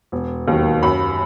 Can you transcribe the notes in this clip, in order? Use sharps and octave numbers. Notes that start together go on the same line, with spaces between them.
E1
D#2 D#3 F#3
F#2 B5